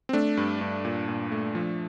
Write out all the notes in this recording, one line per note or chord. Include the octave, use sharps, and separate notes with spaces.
C4
A3 D4
G2
G2
A#2
A#2
A3
F3